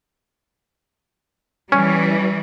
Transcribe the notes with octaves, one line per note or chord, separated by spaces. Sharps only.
E3 G3 C#4